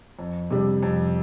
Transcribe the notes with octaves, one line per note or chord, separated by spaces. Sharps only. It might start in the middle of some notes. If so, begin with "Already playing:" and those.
F2
C3 G3 D4
F2